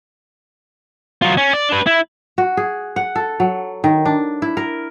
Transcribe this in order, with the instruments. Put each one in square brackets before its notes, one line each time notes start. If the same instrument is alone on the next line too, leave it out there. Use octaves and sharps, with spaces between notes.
[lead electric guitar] F#3 F4
C#4
D5
D4 B4
E4
[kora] F#4
G#4
F#5
A4
F#3
D#3
D4
E4
A#4